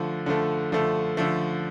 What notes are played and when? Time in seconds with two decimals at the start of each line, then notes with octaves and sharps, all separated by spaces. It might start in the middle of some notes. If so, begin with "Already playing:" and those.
Already playing: D3 F3 A3
0.26 D3 F3 A3
0.72 D3 F3 A3
1.17 D3 F3 A3